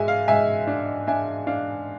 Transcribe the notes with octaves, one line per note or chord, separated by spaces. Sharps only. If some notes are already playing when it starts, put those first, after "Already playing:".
Already playing: G#2 G#3 E5 G#5
F5
G#2 E5 G#5
D4
D4 E5 G#5
D4 F5